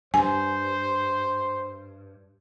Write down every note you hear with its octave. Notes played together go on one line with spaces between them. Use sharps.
G2 C5 G#5